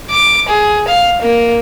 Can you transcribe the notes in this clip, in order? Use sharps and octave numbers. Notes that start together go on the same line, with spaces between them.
D6
G#4
F5
A#3